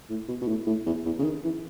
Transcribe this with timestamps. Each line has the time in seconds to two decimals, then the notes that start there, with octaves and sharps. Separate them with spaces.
0.10 A2
0.29 B2
0.42 B2
0.48 A2
0.67 A2
0.86 E2
1.06 E2
1.19 C#3
1.24 D#3
1.44 E3